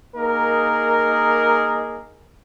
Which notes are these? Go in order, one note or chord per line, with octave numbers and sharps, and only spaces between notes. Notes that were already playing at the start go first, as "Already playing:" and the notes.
A#3 D#4 G#4 A#4